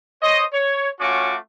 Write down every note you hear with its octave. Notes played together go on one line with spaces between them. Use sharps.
C5 C#5 D#5
C#5
A3 C#4 F4 F#4 D6